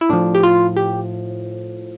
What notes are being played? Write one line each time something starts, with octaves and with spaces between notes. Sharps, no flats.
E4
A2 F3 D4
G4
F4
G4